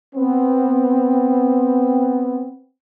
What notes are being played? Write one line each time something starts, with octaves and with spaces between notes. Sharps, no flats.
B3 C4